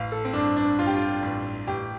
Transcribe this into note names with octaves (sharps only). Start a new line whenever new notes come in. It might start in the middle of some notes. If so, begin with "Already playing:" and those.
Already playing: A1 F5
A4
C4
G2 D4
D4
G2 F4
G4
F4
A1
A1 G4